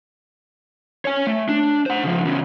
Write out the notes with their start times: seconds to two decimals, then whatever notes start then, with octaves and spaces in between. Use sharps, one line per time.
1.05 C#5 G#5
1.27 A3
1.49 D4
1.86 C5 F#5
2.03 C#3 F3
2.25 E2 C#3